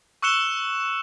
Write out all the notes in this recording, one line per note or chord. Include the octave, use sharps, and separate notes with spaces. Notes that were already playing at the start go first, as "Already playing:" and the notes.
C#6 E6 F#6 C#7 E7 G7